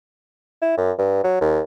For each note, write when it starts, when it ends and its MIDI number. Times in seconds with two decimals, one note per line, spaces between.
0.62 0.73 64
0.77 0.92 42
0.98 1.22 43
1.24 1.38 54
1.41 1.61 39